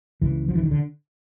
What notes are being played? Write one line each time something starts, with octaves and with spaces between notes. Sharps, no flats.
C#2 C#3 E3
F3
E3
D#3
D3